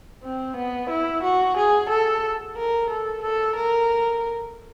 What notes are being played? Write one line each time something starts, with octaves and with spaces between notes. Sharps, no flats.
C4
B3
E4
F#4
G#4
A4
A#4
A4
A4
A#4